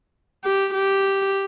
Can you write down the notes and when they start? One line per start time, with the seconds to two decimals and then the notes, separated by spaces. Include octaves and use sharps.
0.45 G4
0.74 G4